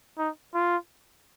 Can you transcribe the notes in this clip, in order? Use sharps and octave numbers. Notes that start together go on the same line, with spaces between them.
D#4
F4